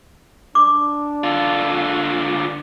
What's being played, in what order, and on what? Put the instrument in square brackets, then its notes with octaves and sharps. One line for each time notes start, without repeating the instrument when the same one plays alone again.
[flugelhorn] D4 [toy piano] D6
[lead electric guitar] D3 F4